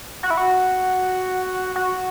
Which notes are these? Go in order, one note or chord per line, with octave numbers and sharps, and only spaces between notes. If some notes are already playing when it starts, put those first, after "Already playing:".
F#4
E4
F#4
F#4